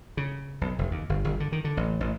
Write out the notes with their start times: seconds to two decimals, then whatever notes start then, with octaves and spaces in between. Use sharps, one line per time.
0.17 C#3
0.61 B1
0.79 F1
0.91 D#2
1.09 G1
1.25 G1
1.40 D3
1.52 D#3
1.64 D3
1.77 A1
2.00 A1